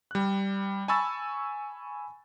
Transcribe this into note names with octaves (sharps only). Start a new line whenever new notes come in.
G3 F#6
G#5 A5 B5 C#6 E6 A6